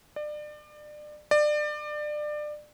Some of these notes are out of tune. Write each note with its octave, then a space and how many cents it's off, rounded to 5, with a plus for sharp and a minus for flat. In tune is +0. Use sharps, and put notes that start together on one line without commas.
D5 +30
D5 +25